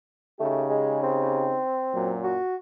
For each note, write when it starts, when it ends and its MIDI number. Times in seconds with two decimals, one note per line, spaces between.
0.40 1.61 49
0.40 0.64 57
0.40 1.61 63
0.40 1.61 67
0.70 1.01 56
1.03 2.12 60
1.94 2.39 42
1.94 2.39 46
1.94 2.39 54
2.24 2.56 66